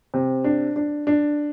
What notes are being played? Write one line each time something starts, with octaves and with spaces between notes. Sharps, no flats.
C3
D4
D4
D4